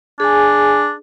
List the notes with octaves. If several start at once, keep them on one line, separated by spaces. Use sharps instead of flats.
D4 G#4 G#5